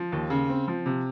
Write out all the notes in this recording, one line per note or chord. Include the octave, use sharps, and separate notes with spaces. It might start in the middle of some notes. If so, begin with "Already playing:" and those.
Already playing: F3
D#2
C#3
C4
F3
C3